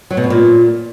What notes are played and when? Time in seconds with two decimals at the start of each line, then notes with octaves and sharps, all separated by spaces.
0.11 F#3
0.17 B2
0.24 F#2
0.30 A#2